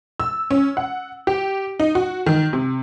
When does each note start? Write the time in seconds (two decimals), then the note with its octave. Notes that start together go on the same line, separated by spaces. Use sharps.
0.20 E6
0.51 C#4
0.77 F#5
1.27 G4
1.80 D#4
1.95 F#4
2.26 D#3
2.53 C3